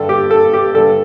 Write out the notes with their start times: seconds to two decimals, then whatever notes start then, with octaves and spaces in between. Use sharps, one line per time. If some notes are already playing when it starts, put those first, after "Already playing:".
Already playing: G2 D3 A4
0.09 G4
0.31 A4
0.53 G4
0.74 G2 D3 A4